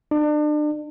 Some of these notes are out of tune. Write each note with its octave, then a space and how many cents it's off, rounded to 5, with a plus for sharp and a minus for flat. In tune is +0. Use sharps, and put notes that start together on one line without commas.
D4 +35